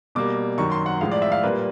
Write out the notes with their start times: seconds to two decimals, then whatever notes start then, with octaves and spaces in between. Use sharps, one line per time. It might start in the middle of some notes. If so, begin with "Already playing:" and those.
0.15 B2 G3 A#3 D6
0.58 F#2 D#3 F#3 C#6
0.72 C6
0.86 F#5
1.01 A2 F3 G#3 F5
1.11 D5
1.22 E5
1.32 F5
1.44 A#2 G3 A#3 B4